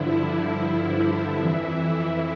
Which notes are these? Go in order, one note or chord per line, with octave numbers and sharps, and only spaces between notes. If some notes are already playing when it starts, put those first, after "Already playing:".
Already playing: G2 D3 F3 E4
F2 E3 E4
E4